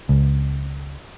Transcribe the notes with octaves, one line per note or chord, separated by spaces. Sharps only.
C#2